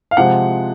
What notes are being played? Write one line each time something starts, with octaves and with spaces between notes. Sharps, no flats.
F5
C3 F3 G#3 F#5